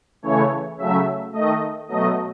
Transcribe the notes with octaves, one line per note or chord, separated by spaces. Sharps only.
C#3 E3 A3 C#5
C#3 F#3 A3 E5
D#3 A3 D#5
B2 F#3 A3 D#5